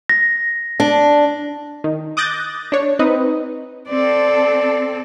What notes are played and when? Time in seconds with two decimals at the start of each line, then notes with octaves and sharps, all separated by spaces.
0.09 A#6
0.80 D4
1.84 D#3
2.17 D6 D#6 F#6 G6 A6 A#6
2.72 D4 C#5
2.99 C4 D#4 B4 D#5
3.89 C4 A4 D5